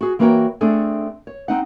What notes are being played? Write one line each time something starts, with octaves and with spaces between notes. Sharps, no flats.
F#4 G#4
E3 A#3 F#4 A#4 C#5 G5
A3 C4 D4 G#4 A4
C#5
C4 D#4 F#5